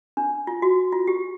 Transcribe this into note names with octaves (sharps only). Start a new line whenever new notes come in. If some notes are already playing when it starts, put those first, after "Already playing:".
D4
F4
F#4
F4
G4